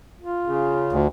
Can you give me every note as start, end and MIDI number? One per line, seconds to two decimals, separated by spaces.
0.21 1.08 65
0.46 0.95 49
0.93 1.08 38